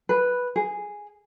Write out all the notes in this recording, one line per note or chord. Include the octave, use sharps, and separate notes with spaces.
B4
G#4